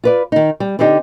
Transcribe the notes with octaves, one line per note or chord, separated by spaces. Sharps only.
F4 B4 D5
D#3 D#4
G3
D3 C4 D4 D#4 G4